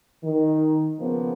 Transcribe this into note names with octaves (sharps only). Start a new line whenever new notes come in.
D#3
C#3 F3 A#3 B3